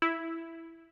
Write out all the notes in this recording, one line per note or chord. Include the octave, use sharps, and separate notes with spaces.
E4